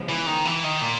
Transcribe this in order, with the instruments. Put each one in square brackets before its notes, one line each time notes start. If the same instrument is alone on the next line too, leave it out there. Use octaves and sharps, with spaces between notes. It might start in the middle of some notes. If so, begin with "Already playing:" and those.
Already playing: [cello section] C#3 F3 G#3 B3
[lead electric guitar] E3
D#3
E3
D#3
A#2